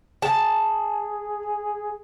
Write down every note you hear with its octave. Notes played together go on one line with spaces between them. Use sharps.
G#4 A5